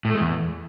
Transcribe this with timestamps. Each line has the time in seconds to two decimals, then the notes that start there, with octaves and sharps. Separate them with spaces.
0.05 A2
0.10 A3
0.15 G#3
0.20 E2